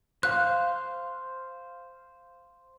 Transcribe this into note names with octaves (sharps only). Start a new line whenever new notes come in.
C5 F5 F#6